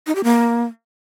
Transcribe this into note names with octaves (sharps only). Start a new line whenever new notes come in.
D#4
G4
A#3